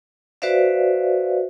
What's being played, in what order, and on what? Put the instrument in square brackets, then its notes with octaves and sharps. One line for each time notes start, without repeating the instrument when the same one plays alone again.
[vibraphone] F#4 B4 C5 D5 E5 F5